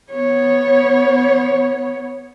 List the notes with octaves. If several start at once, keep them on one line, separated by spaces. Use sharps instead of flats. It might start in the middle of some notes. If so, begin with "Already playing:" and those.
B3 C#5